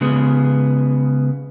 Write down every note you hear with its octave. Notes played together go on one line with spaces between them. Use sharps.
C#3 G#3 B3